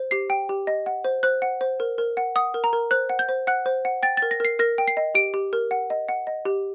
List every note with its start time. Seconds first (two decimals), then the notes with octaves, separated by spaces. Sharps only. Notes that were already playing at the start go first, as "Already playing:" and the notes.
Already playing: C5
0.11 G4 C7
0.30 G5
0.49 G4
0.67 D#5
0.86 F#5
1.04 C5
1.23 C5 F#6
1.42 F#5
1.61 C5
1.80 A#4
1.98 A#4
2.17 F#5
2.36 F#5 D#6
2.54 A#4
2.64 A#5
2.73 A#4
2.91 C5 F#6
3.09 F#5
3.19 G6
3.29 C5
3.47 F#5 F#6
3.66 C5
3.85 F#5
4.03 G5 A6
4.17 A6
4.22 A#4
4.31 A#6
4.40 A#4 C7
4.59 A#4 A#6
4.78 G5
4.88 C7
4.97 D#5
5.15 G4 D7
5.34 G4
5.53 A#4
5.71 F#5
5.90 D#5
6.09 F#5
6.27 D#5
6.45 G4